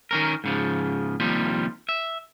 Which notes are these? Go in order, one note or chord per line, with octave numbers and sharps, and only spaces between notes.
D#3 C#4 A#4
G#2 C#3 F3
D#2 C3 F3 G3
E5